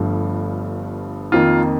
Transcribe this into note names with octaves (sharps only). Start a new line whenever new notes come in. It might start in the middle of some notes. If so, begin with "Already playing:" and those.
Already playing: G1 G2 F3 A3
F2 D#3 A#3 F4